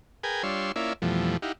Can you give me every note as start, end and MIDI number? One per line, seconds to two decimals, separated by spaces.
0.23 0.43 68
0.23 0.43 70
0.23 0.43 71
0.23 0.43 79
0.23 0.43 80
0.43 0.72 55
0.43 0.72 62
0.43 0.72 65
0.43 0.72 73
0.43 0.72 84
0.43 0.72 88
0.76 0.93 58
0.76 0.93 61
0.76 0.93 64
0.76 0.93 65
0.76 0.93 74
0.76 0.93 76
1.02 1.37 41
1.02 1.37 47
1.02 1.37 52
1.02 1.37 53
1.02 1.37 55
1.02 1.37 57
1.42 1.52 63
1.42 1.52 64
1.42 1.52 67
1.42 1.52 77
1.42 1.52 78